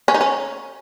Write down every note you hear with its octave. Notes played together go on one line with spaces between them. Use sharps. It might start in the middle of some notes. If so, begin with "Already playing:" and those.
C#4
D#4
C#4